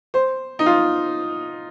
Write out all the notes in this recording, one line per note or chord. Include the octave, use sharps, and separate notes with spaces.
C5
D#4
F4